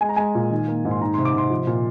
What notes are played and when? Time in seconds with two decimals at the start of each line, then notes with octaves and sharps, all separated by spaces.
0.01 G#3 G#5
0.09 A#5
0.16 G#3 G#5
0.35 A#2
0.51 D#3
0.68 A#3
0.85 G#2
0.91 C6
1.01 D#3 A#5
1.14 C6
1.18 C3
1.25 D6
1.35 C3 C6
1.50 F3
1.67 A#2